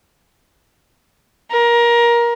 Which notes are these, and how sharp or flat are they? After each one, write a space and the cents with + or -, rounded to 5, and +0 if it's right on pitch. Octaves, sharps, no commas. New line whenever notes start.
A#4 +20